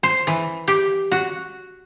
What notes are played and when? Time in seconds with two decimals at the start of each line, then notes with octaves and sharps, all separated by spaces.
0.03 C5
0.27 E3
0.68 G4
1.12 F#4